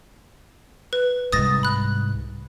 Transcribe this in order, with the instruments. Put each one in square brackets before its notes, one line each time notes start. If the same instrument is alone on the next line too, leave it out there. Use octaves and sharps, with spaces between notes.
[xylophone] B4
[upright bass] C2 G#2 [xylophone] D#6 A6 A#6
[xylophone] B5 F#6